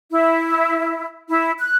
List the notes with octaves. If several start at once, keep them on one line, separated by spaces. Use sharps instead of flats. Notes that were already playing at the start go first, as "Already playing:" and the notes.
E4
E4
F#6